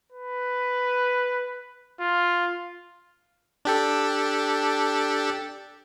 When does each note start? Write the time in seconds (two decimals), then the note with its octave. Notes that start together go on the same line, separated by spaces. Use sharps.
0.12 B4
2.00 F4
3.65 D4 G4 A4